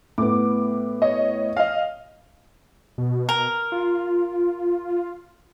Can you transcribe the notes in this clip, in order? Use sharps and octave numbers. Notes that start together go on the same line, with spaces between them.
A2 B3 D6
C#5 D#5
D#5 F5
B2
A#4
F4